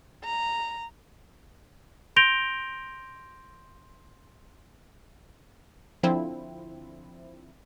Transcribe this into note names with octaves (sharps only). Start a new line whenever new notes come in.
A#5
C6 G6 A#6 D7 F7 G7
D3 F3 C4 E4